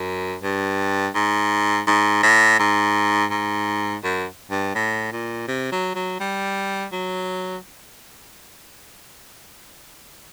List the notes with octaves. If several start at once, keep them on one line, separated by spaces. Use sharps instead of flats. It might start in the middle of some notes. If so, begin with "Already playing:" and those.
Already playing: F#2
G2
G#2
G#2
A2
G#2
G#2
F#2
G2
A2
A#2
C3
F#3
F#3
G3
F#3